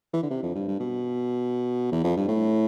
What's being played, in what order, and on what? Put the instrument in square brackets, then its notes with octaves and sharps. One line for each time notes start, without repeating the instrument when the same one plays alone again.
[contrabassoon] E3
D3
C3
F2
G2
G2
B2
E2
F2
G2
A2